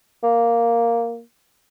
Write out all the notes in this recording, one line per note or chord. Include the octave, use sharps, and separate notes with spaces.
A#3